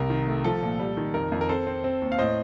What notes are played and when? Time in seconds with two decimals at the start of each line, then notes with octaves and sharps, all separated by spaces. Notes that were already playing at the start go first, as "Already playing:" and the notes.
Already playing: C2 A#4
0.10 D#3
0.27 A3
0.44 F3 A4
0.62 A#2
0.80 G3
0.97 D#3
1.14 F2 A#4
1.32 F2
1.41 A#4
1.49 C4 A4 C5
1.67 C4
1.84 C4
2.02 D#2
2.12 F5
2.18 A2 C5 D#5